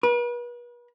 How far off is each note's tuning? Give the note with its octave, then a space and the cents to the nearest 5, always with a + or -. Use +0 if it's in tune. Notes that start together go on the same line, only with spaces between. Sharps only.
B4 -40